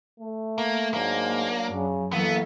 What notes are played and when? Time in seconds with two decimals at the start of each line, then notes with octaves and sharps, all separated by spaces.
0.20 A3
0.58 A#3
0.94 G#2 F#3 A#3 D4
1.71 F#2 C#3
2.12 F#2 E3 F#3 A#3 B3 E4 A4 F5